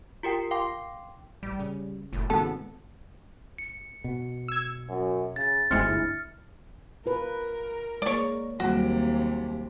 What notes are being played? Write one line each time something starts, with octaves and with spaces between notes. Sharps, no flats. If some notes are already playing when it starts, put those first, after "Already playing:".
F4 G4 A#4 G5
F5 G5 C6 D6
A1 G3
C#3
F#1 A2
G#1 C#3 B3 A4
C#7
B2
E6 G#6
F#2
C#3 A6
G1 D2 G#3 C4 E4 F6 C#7
F4 A#4 B4
G#3 A#3 C#5 D5
D#2 C3 F#3 G3 F#4